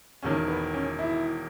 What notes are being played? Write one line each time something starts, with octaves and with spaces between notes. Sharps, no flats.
E1 E2 D#3 C#4
B3
C#4
E4